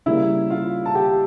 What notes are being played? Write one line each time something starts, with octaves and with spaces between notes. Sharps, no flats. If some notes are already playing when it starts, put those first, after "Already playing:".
C#3 G3 A#3 E4 E5
F4 F5
A5
G4 G5